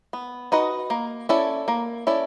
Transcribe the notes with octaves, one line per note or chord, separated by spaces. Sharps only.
B3
D#4 F#4 B4 D#5
A#3
C#4 E4 A4 D5
A#3
C#4 E4 A4 D5